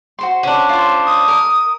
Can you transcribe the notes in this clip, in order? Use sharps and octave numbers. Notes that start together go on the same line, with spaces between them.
F#4 C5 C6
C#4 D4
F4 C5
D#6
A#4